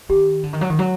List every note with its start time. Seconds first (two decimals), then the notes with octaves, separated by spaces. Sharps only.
0.09 D#3 G4
0.43 D3
0.53 D#3
0.61 F#3
0.70 D#3
0.79 F#3